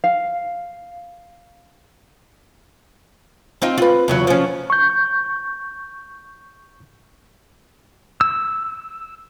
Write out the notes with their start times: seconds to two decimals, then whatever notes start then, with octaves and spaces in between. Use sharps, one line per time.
0.04 F5
3.62 C4 D#4 F4
3.78 F4 B4
4.08 E2 C#3 F#3
4.27 F3 C#4
4.70 C#6 G6
8.21 E6